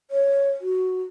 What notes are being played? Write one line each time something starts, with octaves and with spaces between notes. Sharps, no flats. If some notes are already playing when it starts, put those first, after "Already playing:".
C#5
F#4